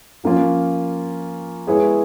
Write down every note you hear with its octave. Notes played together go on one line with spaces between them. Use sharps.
F3 A#3 C#4 F4
G#3 B3 E4 G#4 C#5